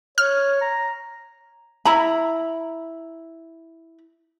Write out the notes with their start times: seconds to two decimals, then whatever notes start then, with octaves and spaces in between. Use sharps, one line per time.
0.18 C#5 F6
0.62 A#5
1.85 E4 A#5 B5